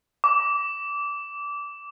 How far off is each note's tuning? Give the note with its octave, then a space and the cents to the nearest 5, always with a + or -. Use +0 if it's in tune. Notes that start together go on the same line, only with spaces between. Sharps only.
D6 -20